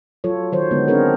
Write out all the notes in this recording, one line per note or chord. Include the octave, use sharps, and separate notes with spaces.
F#3 F4 A4 C#5
D#3 F#3 C5 C#5
D3 G#3 B3
C4 D4 G#4 A#4 C#5